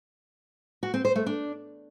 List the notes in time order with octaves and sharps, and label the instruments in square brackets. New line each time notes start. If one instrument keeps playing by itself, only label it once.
[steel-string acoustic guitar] F#4
C4
C5
A3
D4